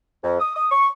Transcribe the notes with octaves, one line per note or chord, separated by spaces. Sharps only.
F2
D#6
D#6
C#6